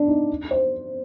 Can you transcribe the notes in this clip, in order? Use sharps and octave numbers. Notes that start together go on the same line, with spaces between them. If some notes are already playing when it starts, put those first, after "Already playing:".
Already playing: D4
D#4
C5